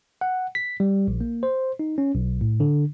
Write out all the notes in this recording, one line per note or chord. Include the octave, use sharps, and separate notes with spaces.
F#5
B6
G3
A#1
A#3
C5
D#4
C#4
B1
A2
D3